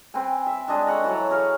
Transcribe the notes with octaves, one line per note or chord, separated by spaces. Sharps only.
C4 B4 G5 G#5
E5
G#3 D4 D#5 G#5
A4 C#5 F#5 A#5
E3 F#3 C#5
G#4 A#4 C#5 F5